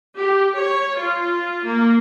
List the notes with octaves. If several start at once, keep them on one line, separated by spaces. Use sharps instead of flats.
G4
C#5
F4
A#3